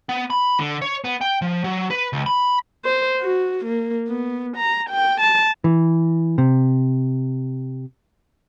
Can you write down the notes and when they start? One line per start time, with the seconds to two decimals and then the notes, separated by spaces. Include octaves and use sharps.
0.09 B3
0.30 B5
0.60 D3
0.82 C#5
1.04 B3
1.21 G5
1.42 F3
1.64 F#3
1.90 B4
2.13 C#2
2.26 B5
2.85 C5
3.21 F#4
3.65 A#3
4.08 B3
4.57 A#5
4.89 G5
5.21 A5
5.64 E3
6.38 C3